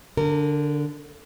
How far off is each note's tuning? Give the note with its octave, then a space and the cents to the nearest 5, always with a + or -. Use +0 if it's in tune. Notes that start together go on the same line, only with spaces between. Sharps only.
D3 -5 A#4 -30